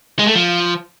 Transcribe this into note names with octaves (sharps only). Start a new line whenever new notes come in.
G#3
A3
F3